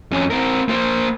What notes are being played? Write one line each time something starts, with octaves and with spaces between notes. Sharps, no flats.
F2 C#4
C4 A#4
A#3 C5